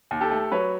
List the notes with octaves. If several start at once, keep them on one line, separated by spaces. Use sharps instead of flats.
D#2
G4 A4
A3
F#3 B4 C#5